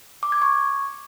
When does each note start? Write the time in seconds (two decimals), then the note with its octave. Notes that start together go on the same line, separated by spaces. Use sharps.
0.23 D6
0.32 G#6
0.42 C#6